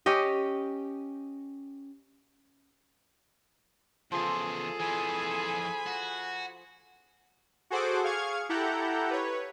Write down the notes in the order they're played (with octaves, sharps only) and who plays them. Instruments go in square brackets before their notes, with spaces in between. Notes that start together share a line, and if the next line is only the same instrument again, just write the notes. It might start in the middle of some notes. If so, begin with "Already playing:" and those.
[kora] C#4 G4 D#5
[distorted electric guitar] E2 C#3 [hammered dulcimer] F3 [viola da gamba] G#4 A4
[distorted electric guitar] F2 E3 [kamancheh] G#5 B5
[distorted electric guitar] F#4
[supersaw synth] F#4 G#4 A4 C5 F#5 D6
G#4 F5 C#6 F6 G#6
E4 G4 A4 F#5 A#5 G6
B4 C#5